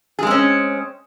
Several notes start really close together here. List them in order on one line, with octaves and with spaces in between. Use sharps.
G#4 G#3 C4 C#4